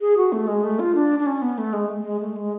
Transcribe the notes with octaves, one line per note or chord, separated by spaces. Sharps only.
G#4
F#4
A3
G#3
A3
F4
D4
D4
C#4
B3
A3
G#3
A3
G#3
A3
G#3